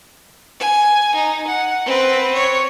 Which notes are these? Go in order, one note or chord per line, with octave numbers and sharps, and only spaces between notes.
G#5
D#4
F#5
C4 B4
C#5